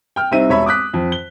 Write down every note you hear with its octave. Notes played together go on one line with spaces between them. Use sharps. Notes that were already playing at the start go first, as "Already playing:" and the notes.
G5 F6
C2 C4 D#4 E5 D#7
E1 C#5 E5 B5
D6 D#6 F#6 B6
F2
G7